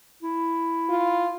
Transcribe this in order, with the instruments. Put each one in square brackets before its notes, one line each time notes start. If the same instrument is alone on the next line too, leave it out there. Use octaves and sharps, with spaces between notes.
[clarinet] E4
[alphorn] F4